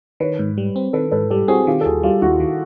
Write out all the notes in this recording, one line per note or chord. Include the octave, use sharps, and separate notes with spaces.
D#3 B4 C#5
G#2
G3
C4
D#3 A4 B4
G#2 A4 B4
G3 G4 A4
C4 F#4 G#4
D#3 F4 G4
A4
D#2 F#4 G#4
G3 F4 G4
D#2 E4 F#4
D#3